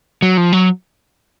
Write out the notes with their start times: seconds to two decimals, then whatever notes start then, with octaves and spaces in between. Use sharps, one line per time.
0.22 F#3
0.37 F3
0.53 F#3